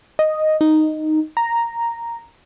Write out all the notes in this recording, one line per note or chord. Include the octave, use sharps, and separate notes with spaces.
D#5
D#4
A#5